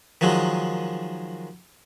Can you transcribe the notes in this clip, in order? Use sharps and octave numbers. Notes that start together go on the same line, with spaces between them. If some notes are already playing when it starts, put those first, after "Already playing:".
D#3 F3 F#3 G#3